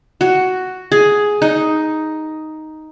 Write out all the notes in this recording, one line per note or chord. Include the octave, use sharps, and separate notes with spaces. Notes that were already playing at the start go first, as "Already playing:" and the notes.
F#4
G#4
D#4